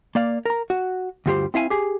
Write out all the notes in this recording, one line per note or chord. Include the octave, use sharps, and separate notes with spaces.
A#3 D5 F5
A#4 A#5
F#4
D2 G2 G3 F4 G4 C5
C4 E4 F5 G#5
G4 G#4